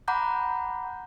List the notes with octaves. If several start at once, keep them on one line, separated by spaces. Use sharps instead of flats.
F#5 A#5 B5 D6 F#6 G6